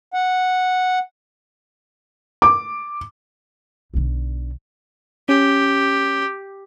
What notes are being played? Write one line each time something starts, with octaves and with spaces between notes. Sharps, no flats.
F#5
D6
B1 D3
C#4 G4